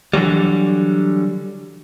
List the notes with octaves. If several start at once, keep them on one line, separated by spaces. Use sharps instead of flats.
D3 E3 F#3 G3